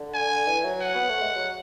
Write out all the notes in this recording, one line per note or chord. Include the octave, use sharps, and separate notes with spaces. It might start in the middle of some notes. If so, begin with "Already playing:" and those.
Already playing: D3
G#5
E3
F#3
F#5
B3
A3
G#3
F#3